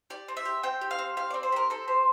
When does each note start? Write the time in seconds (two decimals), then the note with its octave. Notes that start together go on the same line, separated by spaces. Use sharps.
0.10 G4 D5
0.28 C4
0.37 E5
0.45 G4
0.63 C4 G5
0.81 G4
0.91 F5
0.99 C4
1.17 G4 F5
1.30 C4 D5
1.43 C5
1.52 G4 A#4
1.70 C4 A4
1.88 G4 C5